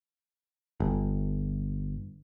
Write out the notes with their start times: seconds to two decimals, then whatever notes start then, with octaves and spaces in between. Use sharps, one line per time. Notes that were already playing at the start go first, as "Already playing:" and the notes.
0.80 G1